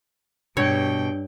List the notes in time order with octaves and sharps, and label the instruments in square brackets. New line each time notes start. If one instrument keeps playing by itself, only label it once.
[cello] G2 G5 [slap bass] B2 [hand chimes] D4 [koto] C#5